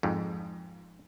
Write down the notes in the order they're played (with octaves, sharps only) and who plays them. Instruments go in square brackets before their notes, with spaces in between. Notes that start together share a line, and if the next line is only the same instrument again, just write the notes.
[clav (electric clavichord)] F2 G#2